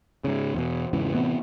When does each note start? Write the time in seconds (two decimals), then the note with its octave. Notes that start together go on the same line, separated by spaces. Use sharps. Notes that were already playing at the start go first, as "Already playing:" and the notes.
0.24 G#2 C#3
0.54 E2 B2
0.93 E2 G#2 C#3 E3
1.15 A2 C3 E3 B3